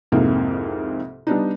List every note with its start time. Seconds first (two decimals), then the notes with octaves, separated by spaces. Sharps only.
0.12 C2 F2 G#2 C3 A#3
1.27 G3 B3 D4 D#4